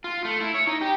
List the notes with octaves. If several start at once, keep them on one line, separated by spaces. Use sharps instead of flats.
F4
A3
E4
C#5
D#4
G4